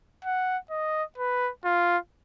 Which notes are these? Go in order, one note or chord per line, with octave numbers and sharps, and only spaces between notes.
F#5
D#5
B4
F4